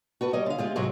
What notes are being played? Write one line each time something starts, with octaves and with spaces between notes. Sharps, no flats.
F#4 A4 B4
G3 C#5 D#5
D3 F5
G#3 F4 G4
G#2 C3 F#3 G#3 F#4